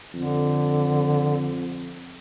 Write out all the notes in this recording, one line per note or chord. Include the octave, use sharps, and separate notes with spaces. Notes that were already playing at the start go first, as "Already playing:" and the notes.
F2 D3